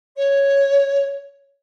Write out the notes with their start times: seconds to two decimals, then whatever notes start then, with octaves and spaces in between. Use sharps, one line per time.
0.16 C#5